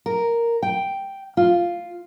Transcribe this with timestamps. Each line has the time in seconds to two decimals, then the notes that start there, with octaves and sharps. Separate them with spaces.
0.06 A#4
0.63 G5
1.37 F4